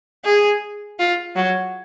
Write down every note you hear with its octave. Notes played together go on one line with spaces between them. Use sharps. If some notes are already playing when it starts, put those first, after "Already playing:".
G#4
F4
F#3